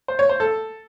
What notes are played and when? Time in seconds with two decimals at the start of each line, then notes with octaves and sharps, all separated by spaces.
0.08 C5
0.19 C#5
0.29 C5
0.40 A4